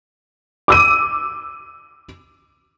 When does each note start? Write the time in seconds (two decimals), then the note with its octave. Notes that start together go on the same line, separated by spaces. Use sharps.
0.68 D6 E6 D#7